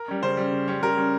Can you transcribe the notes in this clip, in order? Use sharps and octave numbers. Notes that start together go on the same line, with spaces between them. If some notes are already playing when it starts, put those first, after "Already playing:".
Already playing: A#4
G3 C#4
C#3 C5
G3 C#4
C#3
G3 C#4
C#3 A#4
G3 C#4